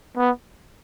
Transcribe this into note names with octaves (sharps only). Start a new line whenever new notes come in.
B3